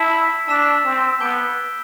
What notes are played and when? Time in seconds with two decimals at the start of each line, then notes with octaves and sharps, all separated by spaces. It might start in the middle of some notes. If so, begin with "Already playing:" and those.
Already playing: E4 A5 E6 B6 E7
0.48 D4 A5 E6 B6 E7
0.84 C4
1.20 B3 A5 D6 G6 D7 G7